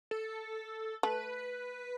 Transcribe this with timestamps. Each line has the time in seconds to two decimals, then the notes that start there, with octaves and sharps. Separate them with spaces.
0.11 A4
1.03 A3 B4